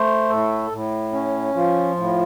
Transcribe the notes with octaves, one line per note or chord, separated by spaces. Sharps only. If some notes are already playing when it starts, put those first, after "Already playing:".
Already playing: A3 C5
A2 A4
A2
C#4
F3 F4
A2